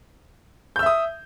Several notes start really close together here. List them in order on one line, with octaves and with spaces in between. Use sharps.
G6 E6 E5 D#6